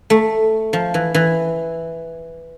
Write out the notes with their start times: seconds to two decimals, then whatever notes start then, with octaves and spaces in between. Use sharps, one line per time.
0.10 A3
0.73 F3
0.94 E3
1.14 E3